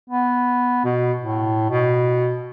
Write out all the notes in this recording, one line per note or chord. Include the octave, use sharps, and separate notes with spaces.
B3
B2
A2
B2